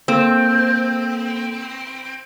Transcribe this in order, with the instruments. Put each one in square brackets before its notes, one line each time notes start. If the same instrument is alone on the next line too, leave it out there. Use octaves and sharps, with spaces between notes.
[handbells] A#3 A4 E6 [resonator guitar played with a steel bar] C4